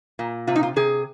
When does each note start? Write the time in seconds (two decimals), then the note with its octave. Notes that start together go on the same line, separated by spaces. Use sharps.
0.19 A#2
0.47 C3 F4
0.56 D#4
0.63 F4
0.76 C3 G#4